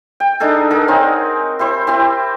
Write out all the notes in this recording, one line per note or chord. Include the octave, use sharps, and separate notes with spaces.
G5
D4 D#4 G#4 A4
G#4 A#4 F#5
C4 D#4 C#5
E4 G4 C5
C4 E4 G4